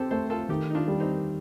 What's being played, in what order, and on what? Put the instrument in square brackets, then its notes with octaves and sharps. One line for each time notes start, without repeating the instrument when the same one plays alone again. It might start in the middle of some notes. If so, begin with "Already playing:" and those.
Already playing: [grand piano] C4 [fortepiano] G4 A4 C5
[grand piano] A3 [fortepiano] A4 C5
[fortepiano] F4 A4
[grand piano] D#3 [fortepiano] D#4 G4
[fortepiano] D#4
D4 F4
[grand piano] G3
[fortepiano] C4 D#4